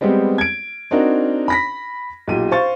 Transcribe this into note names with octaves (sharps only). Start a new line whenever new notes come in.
G3 G#3 B3 C4 G4
G#6 D7
C4 D4 D#4 F#4 A#4
B5 A#6 B6
B1 A#2 G4 D#7
C5 F5 C#6 A6